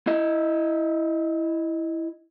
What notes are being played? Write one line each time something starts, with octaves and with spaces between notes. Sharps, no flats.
E4 D#5